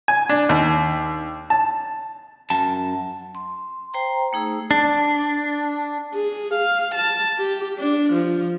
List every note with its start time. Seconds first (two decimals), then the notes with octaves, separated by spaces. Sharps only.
0.08 G#5
0.29 D4
0.49 D#2
1.50 A5
2.50 F#2 A5
3.35 C6
3.94 C5 G5 A#5
4.33 A3 D#4 G#4 E6
4.71 D4
6.15 G#4
6.54 F5
6.95 A5
7.38 G4
7.79 D4
8.13 F3